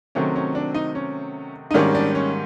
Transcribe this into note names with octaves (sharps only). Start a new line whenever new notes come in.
C3 D#3 F#3 A3 C4 C#4
C#4
D4
D#4
C#4
D#4
G#2 D#3 G3 A#3 C#4 D4
D4
C#4